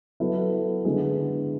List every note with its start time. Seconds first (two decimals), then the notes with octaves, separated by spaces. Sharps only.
0.20 F#3 B3 E4 A4
0.85 D3 G#3 B3 E4 G#4